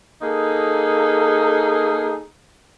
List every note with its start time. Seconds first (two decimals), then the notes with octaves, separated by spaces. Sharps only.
0.22 A#3 D#4 G#4 A4